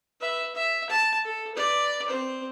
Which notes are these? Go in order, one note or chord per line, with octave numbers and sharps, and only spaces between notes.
B4 E5
E5
A5
A4
B4 D5
C4 C5